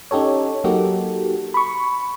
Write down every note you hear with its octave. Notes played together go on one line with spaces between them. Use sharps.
C#4 D#4 G4 A4 C#5
F#3 A#3 D#4 F#4 G4 A4
B5 C#6